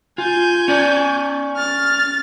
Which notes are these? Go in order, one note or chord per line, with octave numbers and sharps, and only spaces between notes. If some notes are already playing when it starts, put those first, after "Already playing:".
F4 G#5 G6
C#4 D5
F6 A6